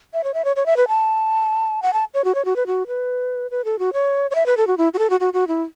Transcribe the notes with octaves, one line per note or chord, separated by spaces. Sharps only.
E5
C#5
E5
C#5
C#5
E5
B4
A5
F#5
A5
C#5
F#4
C#5
F#4
B4
F#4
B4
B4
A4
F#4
C#5
C#5
E5
B4
A4
F#4
E4
F#4
A4
F#4
F#4
F#4
E4